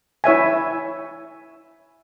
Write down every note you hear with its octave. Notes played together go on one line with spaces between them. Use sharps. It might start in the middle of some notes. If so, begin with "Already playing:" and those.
E4 C#5 E5 G#5